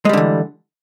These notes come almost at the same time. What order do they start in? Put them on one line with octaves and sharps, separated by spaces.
G#3 G3 D3 E3